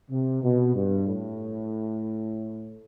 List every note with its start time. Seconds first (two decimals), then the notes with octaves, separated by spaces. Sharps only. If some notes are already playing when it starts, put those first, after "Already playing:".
0.10 C3
0.43 B2
0.75 G2
1.07 A2